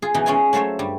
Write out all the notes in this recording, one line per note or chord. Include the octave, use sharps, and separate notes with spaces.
F4 G#4
B2 E3 D#4
G#3 C#4 F4 C#5 D#5 G#5
F#3 A3 F4 C5 C#5 E5
G2 G3